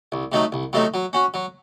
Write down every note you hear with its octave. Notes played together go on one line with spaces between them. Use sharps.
C2
C3 F#3 A3 D#4
C2
C3 F#3 A3 D#4
F#3
C#4 F#4
F#3